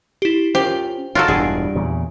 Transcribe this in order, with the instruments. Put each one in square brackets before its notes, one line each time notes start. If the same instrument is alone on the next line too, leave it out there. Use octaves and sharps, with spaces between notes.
[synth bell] E4 G4
[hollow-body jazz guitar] C#4 F4 A#4 [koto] G4 [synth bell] C5
[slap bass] D#3 [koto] F4 F#4 A4 [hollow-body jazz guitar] C#5 A#5 [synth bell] D7
[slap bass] E1 G2 E3 [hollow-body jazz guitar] G3 D4 F#5 [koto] G#4
[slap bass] E2 A#2 C#3